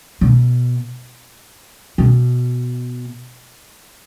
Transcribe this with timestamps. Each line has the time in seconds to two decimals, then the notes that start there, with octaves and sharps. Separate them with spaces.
0.21 B2
1.98 B2